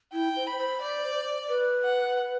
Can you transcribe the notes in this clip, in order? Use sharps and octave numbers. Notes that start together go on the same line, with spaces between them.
E4 G5
C5
B5
C5
D5
B4
F#5